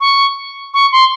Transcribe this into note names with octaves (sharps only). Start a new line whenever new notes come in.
C#6
C#6
C6